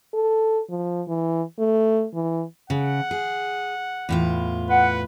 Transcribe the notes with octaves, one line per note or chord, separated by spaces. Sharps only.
A4
F3
E3
A3
E3
C#3 F#5
G#4
E2 A2 F4
B4 F#5